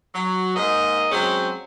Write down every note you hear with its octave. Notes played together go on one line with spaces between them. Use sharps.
F#3
G#2 A#3 D#5
F#3 G#3 C4 C#4